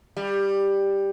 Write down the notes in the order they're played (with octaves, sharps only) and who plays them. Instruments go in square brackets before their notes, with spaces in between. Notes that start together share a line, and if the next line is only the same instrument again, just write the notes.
[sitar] G3